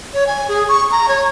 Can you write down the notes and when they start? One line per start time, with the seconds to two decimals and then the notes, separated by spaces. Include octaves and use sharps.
0.14 C#5
0.27 G#5
0.49 G#4
0.69 C#6
0.91 A#5
1.08 C#5